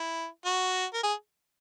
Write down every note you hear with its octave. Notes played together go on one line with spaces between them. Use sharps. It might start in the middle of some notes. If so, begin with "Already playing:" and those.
Already playing: E4
F#4
A#4
G#4